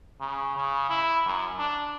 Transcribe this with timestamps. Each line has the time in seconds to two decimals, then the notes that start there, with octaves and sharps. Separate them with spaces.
0.20 C#3
0.57 C#3
0.90 E4
1.26 F#2
1.59 D4